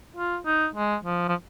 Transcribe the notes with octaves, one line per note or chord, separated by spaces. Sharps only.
F4
D#4
G#3
F3
F3